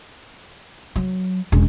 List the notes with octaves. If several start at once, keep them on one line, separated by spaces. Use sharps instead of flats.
F#3
E1 C#4